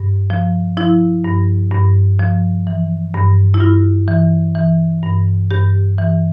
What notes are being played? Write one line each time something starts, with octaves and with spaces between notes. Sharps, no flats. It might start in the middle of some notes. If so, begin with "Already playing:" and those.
Already playing: G2
F3
F3 E4
G2
G2
F3
E3
G2
E4
G2 F4
E3
E3
G2
G2 G4
E3